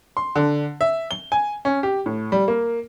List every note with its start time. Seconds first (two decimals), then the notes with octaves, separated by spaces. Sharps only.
0.17 C6
0.36 D3
0.81 E5
1.11 G7
1.32 G#5
1.65 C#4
1.83 G4
2.06 A2
2.32 G3
2.48 A#3